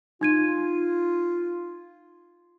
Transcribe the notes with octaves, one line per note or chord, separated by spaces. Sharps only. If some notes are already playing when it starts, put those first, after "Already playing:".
D#4 F4 G#6 D#7